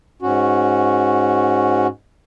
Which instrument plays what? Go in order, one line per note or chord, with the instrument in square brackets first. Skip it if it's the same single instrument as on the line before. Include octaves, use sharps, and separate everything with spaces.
[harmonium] G#2 C#4 F#4